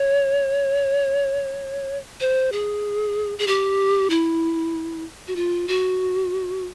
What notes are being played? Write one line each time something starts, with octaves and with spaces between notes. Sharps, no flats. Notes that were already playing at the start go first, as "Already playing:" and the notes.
Already playing: C#5
C5
G#4
G#4
G4
E4
F#4
F4
F#4